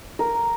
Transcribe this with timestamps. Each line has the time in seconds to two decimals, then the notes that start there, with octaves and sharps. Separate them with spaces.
0.19 A#4